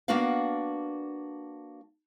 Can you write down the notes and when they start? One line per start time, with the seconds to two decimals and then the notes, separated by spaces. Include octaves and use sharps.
0.08 A#3 B3 D4 F#4 D5 F5